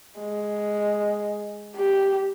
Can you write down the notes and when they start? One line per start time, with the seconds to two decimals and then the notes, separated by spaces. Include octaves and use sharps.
0.19 G#3
1.76 G4